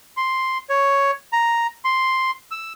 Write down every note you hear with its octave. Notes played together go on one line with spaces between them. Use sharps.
C6
C#5
A#5
C6
E6